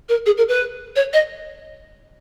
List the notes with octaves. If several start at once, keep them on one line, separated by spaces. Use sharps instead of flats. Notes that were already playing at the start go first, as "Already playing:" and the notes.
A#4
G#4
A#4
B4
C#5
D#5